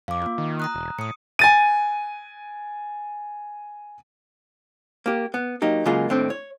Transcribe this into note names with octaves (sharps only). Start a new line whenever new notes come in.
F2 F5 D6
A#3 F4
D#3
A#5 D#6 F#6
E1
A2 D#6 C#7
G#5 A6 D#7
A#3 G4
B3
F#3 A#3 D#4 G4
C#3 F#3 G#3 A#3 F4
D#2 A2 C4 D4
C#5